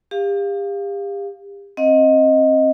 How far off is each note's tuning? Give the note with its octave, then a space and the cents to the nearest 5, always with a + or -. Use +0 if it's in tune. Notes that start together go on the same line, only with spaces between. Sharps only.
G4 +35 F5 +0
C4 +30 D#5 +10 F#5 -45